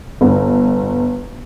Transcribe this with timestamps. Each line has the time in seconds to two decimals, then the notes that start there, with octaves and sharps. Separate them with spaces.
0.21 G1